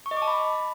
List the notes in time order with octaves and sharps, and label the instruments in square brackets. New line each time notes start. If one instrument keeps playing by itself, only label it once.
[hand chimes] C#6
D#5
D6
A5
B5